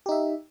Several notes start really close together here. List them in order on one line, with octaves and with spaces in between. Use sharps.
G4 D#4 E5